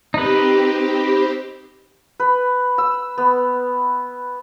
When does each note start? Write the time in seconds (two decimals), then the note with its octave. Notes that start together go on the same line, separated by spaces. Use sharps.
0.14 C4 D#4 G4 B4
2.20 B4
2.78 E6
3.18 B3